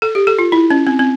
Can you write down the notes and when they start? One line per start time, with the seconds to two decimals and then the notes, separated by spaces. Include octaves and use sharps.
0.02 A4
0.15 G4
0.27 A4
0.39 F4
0.52 E4
0.70 C#4
0.87 C4
0.99 C4